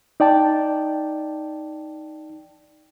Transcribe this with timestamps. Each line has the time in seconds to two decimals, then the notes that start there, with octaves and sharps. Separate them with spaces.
0.20 D#4 D5 G5 A5